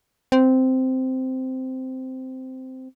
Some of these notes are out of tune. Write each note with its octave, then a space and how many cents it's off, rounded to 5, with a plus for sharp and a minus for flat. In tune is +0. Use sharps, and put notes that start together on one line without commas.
C4 -10